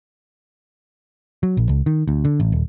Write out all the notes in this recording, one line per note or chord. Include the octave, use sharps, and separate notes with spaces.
F#3
A#1
C#2
D#3
D2
D3
A1
D#1